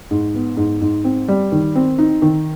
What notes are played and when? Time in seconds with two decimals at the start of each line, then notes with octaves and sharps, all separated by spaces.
0.11 G#2
0.34 B3
0.57 G#2
0.81 G#2
1.04 C4
1.28 G3
1.52 D#3
1.75 C4
1.98 D#4
2.22 D#3